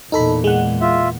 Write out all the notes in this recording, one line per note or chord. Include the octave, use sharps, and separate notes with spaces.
E2 A#2 D#4 A4 B5
G#3 F#5
F4 E5